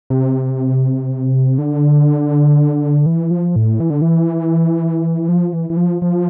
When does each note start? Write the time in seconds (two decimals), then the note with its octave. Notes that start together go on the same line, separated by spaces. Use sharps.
0.10 C3
1.58 D3
3.06 E3
3.31 F3
3.56 A2
3.80 E3
3.90 D3
4.02 E3
5.29 F3
5.53 E3
5.70 E3
5.77 F3
6.02 F3